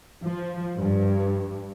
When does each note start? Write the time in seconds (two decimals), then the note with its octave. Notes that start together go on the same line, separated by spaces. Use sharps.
0.25 F3
0.78 G2